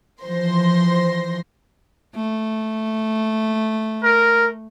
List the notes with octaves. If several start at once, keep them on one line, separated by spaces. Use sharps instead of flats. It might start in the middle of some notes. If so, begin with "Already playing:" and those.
E3 F3 C5 C6 A#6
A3
A#4